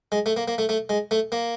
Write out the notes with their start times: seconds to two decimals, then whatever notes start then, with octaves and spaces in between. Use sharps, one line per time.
0.12 G#3
0.26 A3
0.37 A#3
0.48 A#3
0.58 A3
0.69 A3
0.89 G#3
1.11 A3
1.32 A#3